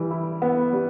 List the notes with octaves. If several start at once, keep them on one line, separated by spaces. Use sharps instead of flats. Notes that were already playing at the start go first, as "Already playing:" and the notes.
Already playing: E3 G3
E4
B3
G3